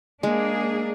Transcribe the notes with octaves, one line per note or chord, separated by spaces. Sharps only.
G#3 A#3 D4 G#4